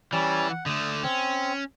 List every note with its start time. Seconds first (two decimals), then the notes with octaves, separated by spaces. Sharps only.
0.13 E3 G3 C#4 D5
0.50 F#5
0.66 D3 A3 D#6
1.03 C4 C#4